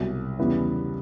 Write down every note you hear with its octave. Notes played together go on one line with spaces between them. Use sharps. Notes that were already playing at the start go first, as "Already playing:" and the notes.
Already playing: C2 B2 F#3
E2 C#3 E3 G3 B3